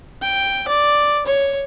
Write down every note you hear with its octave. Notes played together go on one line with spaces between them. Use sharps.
G5
D5
C#5